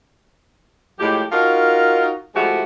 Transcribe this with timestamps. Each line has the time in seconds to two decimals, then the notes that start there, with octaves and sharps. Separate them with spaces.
0.99 A2 F3 G#3 G4
1.32 D#4 F4 F#4 A#4
2.35 F3 G#3 A3 E4 F#4 G4